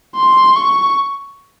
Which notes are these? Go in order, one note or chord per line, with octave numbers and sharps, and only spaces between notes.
C6
C#6